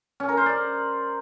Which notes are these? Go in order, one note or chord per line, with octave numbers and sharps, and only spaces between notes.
C#4
A#4
C5
D5